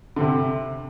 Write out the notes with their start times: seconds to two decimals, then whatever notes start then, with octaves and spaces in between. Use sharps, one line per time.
0.16 D3
0.20 C3